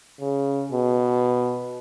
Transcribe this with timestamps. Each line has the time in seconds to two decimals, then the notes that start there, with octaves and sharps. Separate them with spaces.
0.20 C#3
0.72 B2